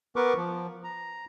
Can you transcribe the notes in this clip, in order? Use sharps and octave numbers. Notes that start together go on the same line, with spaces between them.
B3 A#4 B4 C#6 D6
F3
A#5